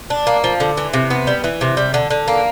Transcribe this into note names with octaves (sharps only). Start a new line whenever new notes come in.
D4
A#3
F3
D3
E3
C3
B3
G3
E3
C3
G3
D3
D3
A#3